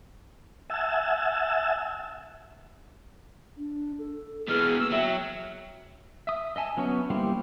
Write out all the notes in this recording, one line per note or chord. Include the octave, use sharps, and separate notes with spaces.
E5 F#5 G#5 A5 E6
D4
A4
B2 E3 G#4 F6
A#3 E6
F#3 E5 G5
E5 D#6
D#5 E5 G#5 A5
F#3 B3 C#4 C#5
G3 A#3 E4 G4 C5